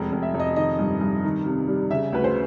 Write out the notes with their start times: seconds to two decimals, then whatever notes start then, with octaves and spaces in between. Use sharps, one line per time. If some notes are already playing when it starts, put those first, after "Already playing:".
Already playing: F1 G#3
0.12 F1
0.23 E5
0.34 F1
0.40 D#5
0.56 D#3 D#5
0.79 G2
1.01 G2
1.24 D#3
1.46 C3
1.68 G3
1.91 C#3 E5
2.13 D2 B4
2.24 C5